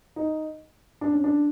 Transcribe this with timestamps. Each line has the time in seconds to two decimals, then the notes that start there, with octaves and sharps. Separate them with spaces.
0.16 D#4
1.01 D4
1.13 C#4
1.24 D4